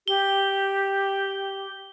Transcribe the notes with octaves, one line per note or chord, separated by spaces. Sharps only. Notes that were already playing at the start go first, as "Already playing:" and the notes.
G4 G7